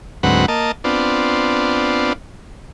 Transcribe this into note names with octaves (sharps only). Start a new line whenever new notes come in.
D2 G#2 F#3 C4 B4 F#5
A#3 D#5 A5
B3 C4 D4 F4